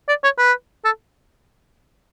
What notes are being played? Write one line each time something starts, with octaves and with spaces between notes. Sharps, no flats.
D5
C#5
B4
A4